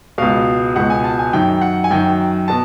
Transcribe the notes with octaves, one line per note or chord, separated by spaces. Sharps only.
C#2 B2 F5
C#2 B2 F#5
G#5
A5
G#5
F#2 D#3 G5
F#5
G#5
F#2 D#3 G5
B2 A5